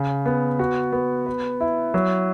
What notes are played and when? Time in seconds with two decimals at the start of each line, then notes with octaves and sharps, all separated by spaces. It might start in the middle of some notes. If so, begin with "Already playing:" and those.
Already playing: C#3
0.26 B3
0.59 F#4
0.93 B3
1.26 B4
1.61 E4
1.94 F#3